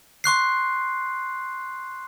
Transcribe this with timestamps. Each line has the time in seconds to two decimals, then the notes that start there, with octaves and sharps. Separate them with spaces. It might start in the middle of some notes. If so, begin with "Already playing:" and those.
0.24 C6 C#6 F#6 C7